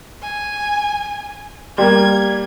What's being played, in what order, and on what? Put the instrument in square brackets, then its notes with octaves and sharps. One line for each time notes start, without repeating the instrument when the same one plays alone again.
[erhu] G#5
[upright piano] G3 A#3 [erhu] G#6